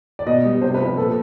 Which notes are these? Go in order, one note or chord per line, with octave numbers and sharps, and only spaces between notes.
D5
B2 D#5
G3
C3 C5
B4
F3
B4
A#2 A4